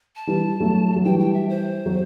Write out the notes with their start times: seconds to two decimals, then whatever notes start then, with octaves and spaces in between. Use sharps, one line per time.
0.16 A5
0.27 E3 G3
0.60 F#3 A3
0.96 F#3
1.04 E3 G3 G5
1.20 G5
1.33 E5
1.49 C5
1.86 F#3